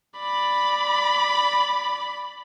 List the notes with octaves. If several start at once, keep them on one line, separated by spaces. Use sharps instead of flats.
D5 B5